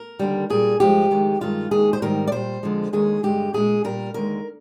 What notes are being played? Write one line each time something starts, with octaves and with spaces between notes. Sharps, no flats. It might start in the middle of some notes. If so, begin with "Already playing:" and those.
Already playing: A#4
D#2 D3 G3
A#2 G3 G#4
G2 F3 G#3 G4
F2 D#3 G#3
G2 D#3 G#3 F4
D#2 D#3 G#3 G#4
C5
G#2 D#3 G3 A#4
D5
A#2 G3 C5
F2 D3 F3 G#3
D#2 D#3 G#3 G#4
G2 D3 G#3 G4
A#2 G#3 G#4
A#2 G3 A#4
D#2 D3 G#3 A#4